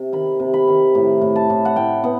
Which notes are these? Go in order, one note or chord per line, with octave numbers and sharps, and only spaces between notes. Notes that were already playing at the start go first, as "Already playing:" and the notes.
Already playing: C3
D#3 B5
C3
B5
D#3
A2
A2
A5
A2
F#5
A2 G5
B3 F#5